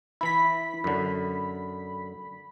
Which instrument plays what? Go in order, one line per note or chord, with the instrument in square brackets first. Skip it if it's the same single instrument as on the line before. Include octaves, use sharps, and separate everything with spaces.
[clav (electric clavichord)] E3 E4 [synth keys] B5 B6
[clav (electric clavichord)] F#2 D3